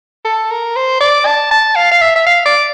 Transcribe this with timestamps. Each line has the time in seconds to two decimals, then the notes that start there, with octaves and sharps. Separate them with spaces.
0.25 A4
0.51 A#4
0.76 C5
1.00 D5
1.26 A5
1.51 A5
1.76 F5
1.91 F5
2.01 E5
2.16 E5
2.26 F5
2.45 D5